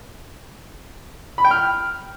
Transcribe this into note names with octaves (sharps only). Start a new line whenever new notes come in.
B5
G5
F6